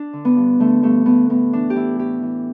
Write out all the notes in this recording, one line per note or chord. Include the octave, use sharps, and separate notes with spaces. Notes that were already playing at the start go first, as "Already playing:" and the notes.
Already playing: D4
D3
B3
G2
D3 A3
G2 A3
D3 B3
A2 B3
E3 D4
G4
E3 E4
A2 G4
E3